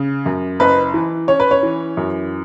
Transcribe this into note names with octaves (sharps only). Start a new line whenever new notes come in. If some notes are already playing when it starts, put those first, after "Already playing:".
Already playing: C#3
F#2
F#1 B4
E3
C#4 C#5
B4
C#5
E3
F#2